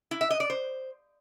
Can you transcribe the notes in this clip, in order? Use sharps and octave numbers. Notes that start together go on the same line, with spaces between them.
E4
E5
D#5
D5
C5